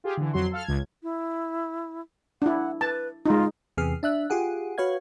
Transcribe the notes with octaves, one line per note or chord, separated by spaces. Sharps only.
F4 G4 G#4
D3 E3
F2 F#3 C6
A4 F5 F6
C#2 G#6
E4
D4 E4 F#5
B4 A5
G#3 D#4 F4
E2 C3 G#4 F6 C7
D4 E5 F#6
F4 G4 G#4 F#5
F#4 B4 C#5 F5 G#6